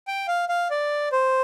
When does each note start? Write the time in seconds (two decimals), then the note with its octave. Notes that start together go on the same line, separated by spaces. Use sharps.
0.08 G5
0.28 F5
0.49 F5
0.71 D5
1.12 C5